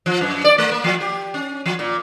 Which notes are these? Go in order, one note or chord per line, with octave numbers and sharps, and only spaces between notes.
F3
F#2
D5
A3
A#3
F3
G4
C#4
F3
A#2